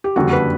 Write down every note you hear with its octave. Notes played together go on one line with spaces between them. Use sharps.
G4
F#1 F2 D3 G3 F#4
B4